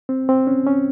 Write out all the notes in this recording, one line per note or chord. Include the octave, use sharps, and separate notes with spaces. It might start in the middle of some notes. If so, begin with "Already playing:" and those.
C4
C4
C#4
C#4